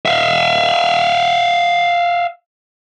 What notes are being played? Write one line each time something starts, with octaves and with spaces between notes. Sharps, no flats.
E5 F5